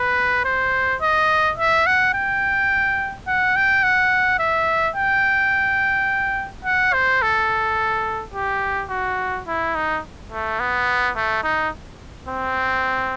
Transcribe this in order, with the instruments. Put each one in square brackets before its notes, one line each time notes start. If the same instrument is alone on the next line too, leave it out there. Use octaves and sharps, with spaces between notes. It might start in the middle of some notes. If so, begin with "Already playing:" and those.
Already playing: [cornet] B4
C5
D#5
E5
F#5
G5
F#5
G5
F#5
E5
G5
F#5
C5
A4
G4
F#4
E4
D#4
A3
B3
A3
D#4
C4